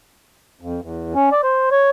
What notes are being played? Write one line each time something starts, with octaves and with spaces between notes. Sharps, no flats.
F2
E2
C#4
D5
C5
C#5